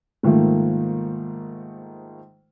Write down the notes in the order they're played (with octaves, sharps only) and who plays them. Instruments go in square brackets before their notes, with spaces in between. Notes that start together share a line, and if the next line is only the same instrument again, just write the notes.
[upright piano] G#2 D#3 F3 A3 A#3